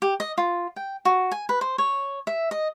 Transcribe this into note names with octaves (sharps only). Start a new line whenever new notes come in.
G4
D#5
F4
G5
F#4
G#5
B4
C5
C#5
E5
D#5